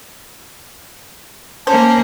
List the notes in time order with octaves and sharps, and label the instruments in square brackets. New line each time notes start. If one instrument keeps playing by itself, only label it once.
[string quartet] A#3 C#4 [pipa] C5 [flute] A5